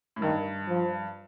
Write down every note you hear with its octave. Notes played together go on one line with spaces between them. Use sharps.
A2
G2 D#3
F3